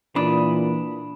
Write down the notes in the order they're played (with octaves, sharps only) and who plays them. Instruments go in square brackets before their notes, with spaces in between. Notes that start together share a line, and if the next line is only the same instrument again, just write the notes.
[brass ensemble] A#2 [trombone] E3 [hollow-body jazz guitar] D4 [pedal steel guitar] B5 D#6